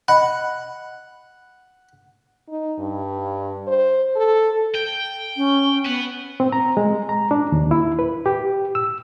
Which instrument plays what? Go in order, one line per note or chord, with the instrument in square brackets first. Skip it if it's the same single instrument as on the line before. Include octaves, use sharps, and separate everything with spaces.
[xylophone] D#5 B5 [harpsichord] F#5
[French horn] D#4
G2
C5
A4
[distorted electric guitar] G5
[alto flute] C#4
[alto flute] B3 [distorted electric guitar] B4 F#5
[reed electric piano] C4
A#5
G#3
A#5
D4
D#2
E4
B4
G4
E6